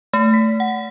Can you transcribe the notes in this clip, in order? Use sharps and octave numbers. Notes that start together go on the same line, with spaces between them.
A3
B6
F#5